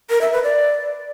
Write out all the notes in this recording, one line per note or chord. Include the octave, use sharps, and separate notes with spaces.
A#4
E5
B4
D5